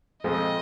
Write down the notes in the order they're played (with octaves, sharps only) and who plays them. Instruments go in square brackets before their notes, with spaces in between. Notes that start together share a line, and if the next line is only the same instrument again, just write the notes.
[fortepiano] F2 F3 G#3 [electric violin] D#5